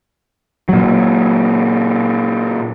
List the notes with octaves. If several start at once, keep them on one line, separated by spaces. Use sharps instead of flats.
A#2 F#3